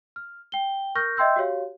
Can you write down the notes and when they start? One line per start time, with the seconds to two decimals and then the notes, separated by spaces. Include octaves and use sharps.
0.16 F6
0.52 G5 G7
0.95 A#4 C#6 F6 G6 A#6
1.17 D#5 E5 G5 C6 E6 G6
1.36 F#4 G4 C#5 F5